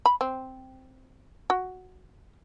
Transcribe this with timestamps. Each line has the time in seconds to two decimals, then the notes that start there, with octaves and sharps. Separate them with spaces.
0.06 B5
0.21 C4
1.50 F#4